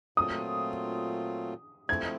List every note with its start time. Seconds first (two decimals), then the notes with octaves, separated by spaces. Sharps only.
0.17 A#2 F#3 A3 C4 F4 D#6
1.89 F3 A3 C4 E4 G#6